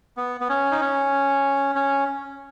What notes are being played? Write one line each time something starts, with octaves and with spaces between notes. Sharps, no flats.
B3
B3
C#4
D#4
C#4
C#4